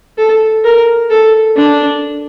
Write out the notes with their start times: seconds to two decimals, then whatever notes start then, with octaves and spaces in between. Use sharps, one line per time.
0.18 A4
0.64 A#4
1.10 A4
1.56 D4